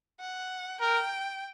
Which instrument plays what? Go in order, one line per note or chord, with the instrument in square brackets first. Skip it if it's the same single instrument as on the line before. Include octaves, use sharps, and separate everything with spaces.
[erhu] F#5
[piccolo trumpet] A#4 [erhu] G5